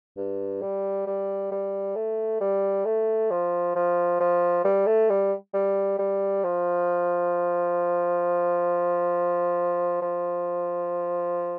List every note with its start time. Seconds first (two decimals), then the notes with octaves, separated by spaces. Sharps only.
0.17 G2
0.62 G3
1.07 G3
1.51 G3
1.96 A3
2.41 G3
2.85 A3
3.31 F3
3.76 F3
4.20 F3
4.64 G3
4.86 A3
5.09 G3
5.54 G3
5.99 G3
6.44 F3
10.02 F3